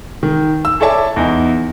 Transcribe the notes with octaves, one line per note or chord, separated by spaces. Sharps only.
D#3
E6
E4 A4 C#5 D5 E5 A5
E2 D#4